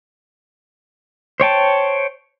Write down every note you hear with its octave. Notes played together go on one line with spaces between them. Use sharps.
C5 C#5 G5 A5